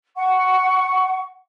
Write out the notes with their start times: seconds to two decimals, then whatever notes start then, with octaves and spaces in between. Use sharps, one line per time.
0.16 F#5 C#6